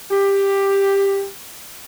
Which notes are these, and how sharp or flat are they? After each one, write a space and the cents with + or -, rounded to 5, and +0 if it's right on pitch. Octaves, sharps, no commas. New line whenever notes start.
G4 +10